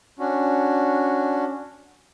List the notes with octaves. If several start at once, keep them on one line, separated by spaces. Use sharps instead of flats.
C#4 D4 F#4